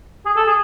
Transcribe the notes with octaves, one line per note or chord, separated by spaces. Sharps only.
G#4
A4
G#4